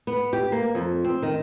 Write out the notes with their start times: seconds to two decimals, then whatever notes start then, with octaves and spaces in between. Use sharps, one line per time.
0.07 B3
0.33 G4
0.52 A#3
0.75 F2
1.04 C4
1.22 D#3